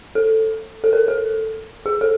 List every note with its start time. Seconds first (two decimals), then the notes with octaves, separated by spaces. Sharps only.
0.15 A4
0.84 A4
0.93 A#4
1.08 A4
1.86 G#4
2.01 A4